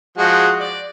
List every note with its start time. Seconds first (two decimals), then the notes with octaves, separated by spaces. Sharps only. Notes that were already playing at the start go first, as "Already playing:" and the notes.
0.18 F3 G#3 F#4
0.60 D5